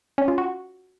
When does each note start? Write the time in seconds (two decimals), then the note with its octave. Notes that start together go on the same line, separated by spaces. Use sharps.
0.18 C#4
0.28 F4
0.38 F#4